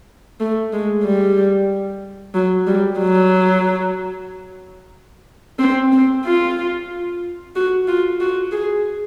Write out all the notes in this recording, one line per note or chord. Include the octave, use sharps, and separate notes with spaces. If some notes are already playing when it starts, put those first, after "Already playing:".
A3
G#3
G3
F#3
G3
F#3
C4
C4
F4
F#4
F4
F#4
G#4